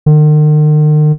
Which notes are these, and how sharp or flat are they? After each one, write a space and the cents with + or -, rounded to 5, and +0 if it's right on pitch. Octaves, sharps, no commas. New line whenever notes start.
D#3 -45